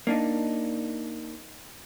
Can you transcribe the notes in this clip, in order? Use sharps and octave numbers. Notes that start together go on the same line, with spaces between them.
A#3 D4 D#4